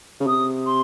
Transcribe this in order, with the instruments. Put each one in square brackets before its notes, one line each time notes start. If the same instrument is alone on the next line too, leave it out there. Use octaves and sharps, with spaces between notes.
[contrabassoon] C#3
[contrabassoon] C3 [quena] D#6
[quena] C6